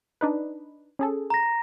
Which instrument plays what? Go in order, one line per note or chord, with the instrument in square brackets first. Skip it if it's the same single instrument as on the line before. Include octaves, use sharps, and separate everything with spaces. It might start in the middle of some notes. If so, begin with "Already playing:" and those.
[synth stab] D4 D#4 B4
C#4 G#4 A4
[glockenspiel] A#5 A#6